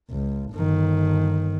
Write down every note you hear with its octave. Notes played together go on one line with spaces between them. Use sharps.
C#2
G1 D#3